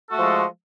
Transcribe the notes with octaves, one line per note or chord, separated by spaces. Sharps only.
F3 G#3 A3 F#4 A4